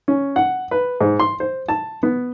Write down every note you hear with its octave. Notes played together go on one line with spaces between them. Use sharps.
C#4
F#5
B4
G#2
C6
C5
A5
B3